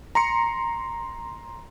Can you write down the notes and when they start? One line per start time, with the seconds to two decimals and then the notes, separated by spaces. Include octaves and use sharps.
0.15 A#5 C6 C#7